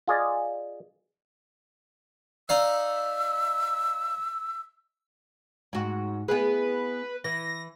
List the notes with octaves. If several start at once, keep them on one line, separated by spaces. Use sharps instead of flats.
F4 G#4 D5 D#5
D#4 D5 F5 E6
G#2 F#4
B3 E4 G#4 B4
E3 A#6